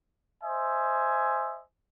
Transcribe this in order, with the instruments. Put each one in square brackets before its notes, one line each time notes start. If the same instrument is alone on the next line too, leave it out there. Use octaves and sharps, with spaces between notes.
[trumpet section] C5 D#5 E5 G#5